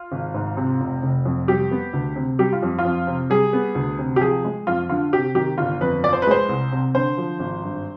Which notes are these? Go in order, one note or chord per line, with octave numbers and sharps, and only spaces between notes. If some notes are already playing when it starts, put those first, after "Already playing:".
Already playing: F4
G#1
G#2
C3
F1
F1
F2
G3 G4
B3
D2
C3
G3 G4
F4
F2
F4
F2
C3
G3 G#4
B3
D2
C3
G4
F3 G#4
G#3
F2 F4
D3 F4
C3 G4
D#3 G4
G1 F4
F2 B4
F3 D5
C5
B4
G#3 C5
C2
C3
D3 C5
F3
G#1
G2